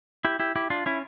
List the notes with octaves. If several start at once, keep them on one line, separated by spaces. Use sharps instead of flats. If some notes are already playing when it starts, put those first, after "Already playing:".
E4 G4
E4 G4
E4 G4
D4 F4
C#4 E4